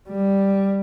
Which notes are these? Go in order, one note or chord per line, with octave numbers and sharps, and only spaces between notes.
G3